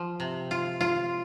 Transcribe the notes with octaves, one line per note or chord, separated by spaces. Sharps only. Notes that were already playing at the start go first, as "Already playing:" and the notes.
Already playing: F3
C3
F4
F4